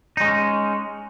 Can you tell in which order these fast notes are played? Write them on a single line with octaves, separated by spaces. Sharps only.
D#4 G#3 C#4